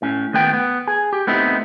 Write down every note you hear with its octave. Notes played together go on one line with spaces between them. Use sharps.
A2 C#4
D#2 A3 B3 G5
B3
G#4
G4
A3 B3 C4 D#4 E4